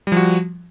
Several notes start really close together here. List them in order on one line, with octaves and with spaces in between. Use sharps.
G3 F3 F#4